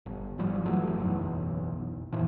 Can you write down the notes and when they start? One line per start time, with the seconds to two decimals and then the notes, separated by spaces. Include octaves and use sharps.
0.06 G1
0.38 G#1 F3 G3
0.65 G2 E3 F#3 A3
0.98 F#1 B1 E2
2.12 F#2 A#2 E3 F3